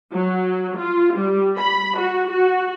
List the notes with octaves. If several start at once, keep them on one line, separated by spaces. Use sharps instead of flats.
F#3
F4
G3
B5
F#4
F#4